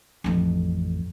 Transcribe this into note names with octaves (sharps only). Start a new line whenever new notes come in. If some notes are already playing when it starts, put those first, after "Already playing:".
A1 F2